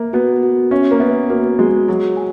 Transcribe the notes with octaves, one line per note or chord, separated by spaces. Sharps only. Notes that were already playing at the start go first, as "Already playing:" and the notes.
Already playing: A#3 E5
B3 F#4
F#4
C#4 E5
A#3
B3 E5
A#3 F#4
G#3 F#4
F#3 G#4
G#5